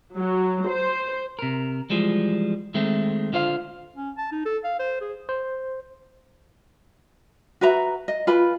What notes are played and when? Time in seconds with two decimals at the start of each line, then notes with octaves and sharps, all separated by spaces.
0.16 F#3
0.68 C5
1.39 C3 A#4
1.90 E3 F3 G3 G#3
2.74 D#3 G#3 A3 C4
3.33 D3 F4 C5 F5
3.96 C#4
4.18 A5
4.32 D#4
4.46 A4
4.64 F5
4.80 C5
5.01 G#4
5.29 C5
7.61 F#4 B4 E5 A#5
8.08 D#5
8.27 F4 B4 G#5 B5